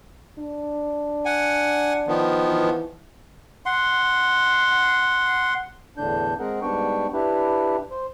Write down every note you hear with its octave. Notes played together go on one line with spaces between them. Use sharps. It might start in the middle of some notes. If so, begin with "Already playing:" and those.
D4
F#5 G#5
D#3 F3 B3
E3
F#5 C6
E2 A2 D3 D4 G6
G#3 C4 G#4 A#4 F#5
G#2 G3 B3 D4 G5 C#6
D4 E4 G4 B4
C5